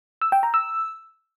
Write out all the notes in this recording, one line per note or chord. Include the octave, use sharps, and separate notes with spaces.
E6
G5
A#5
E6